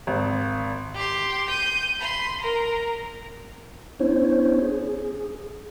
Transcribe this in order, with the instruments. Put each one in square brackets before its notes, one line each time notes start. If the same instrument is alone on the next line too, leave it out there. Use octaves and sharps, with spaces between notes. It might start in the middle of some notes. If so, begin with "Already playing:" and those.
[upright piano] G#1
[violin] G4 C6
G6 D#7
B5 C6
A#4
[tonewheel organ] B3 C#4 D4 E4 C5 C#5
G#4